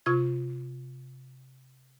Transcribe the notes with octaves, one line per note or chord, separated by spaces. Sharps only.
C3 F4 C#6 G#6